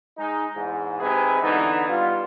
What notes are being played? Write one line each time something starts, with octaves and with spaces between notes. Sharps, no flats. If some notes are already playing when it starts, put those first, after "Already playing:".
G#3 D#4
E2 G#2
C3 G#3 D#4 G#4 B4
D3 E3 B3 D#4
G3 B3 F4